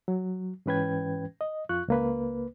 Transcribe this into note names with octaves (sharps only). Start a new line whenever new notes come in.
F#3
G#2 E3 C#4 B4 G5 G#6
D#5
F2 F4 C#6 F#6
C#2 A#3 B4